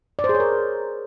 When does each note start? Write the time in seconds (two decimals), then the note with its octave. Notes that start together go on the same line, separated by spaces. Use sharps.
0.19 D5
0.24 C5
0.29 G#4
0.35 C#5
0.40 A#4